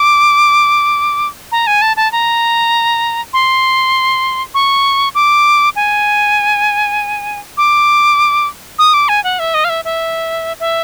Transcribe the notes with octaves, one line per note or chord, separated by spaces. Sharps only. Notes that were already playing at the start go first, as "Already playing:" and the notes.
Already playing: D6
A#5
G#5
A5
A5
A#5
C6
C#6
D6
G#5
D6
D#6
D6
G#5
F#5
E5
D#5
F5
E5
E5
E5